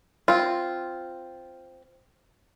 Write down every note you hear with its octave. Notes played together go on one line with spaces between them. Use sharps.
C4 F4